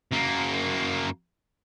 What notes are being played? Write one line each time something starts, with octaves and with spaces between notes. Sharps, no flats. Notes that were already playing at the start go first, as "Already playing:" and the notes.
F#2 A#3